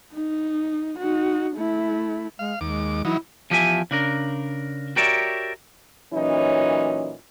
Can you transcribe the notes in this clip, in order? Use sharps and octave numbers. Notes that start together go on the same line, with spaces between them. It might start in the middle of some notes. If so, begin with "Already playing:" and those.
D#4
D#4 F#4
A3 E4
G#3 F5
D#2 G#3 D6
E3 F#3 D#4 E4
E2 F3 G4 C5 E5 G#5
C#3 D4 A#4
F#4 G4 A#4 C#5 D5 E5
A#2 E3 F#3 C#4 D#4 E4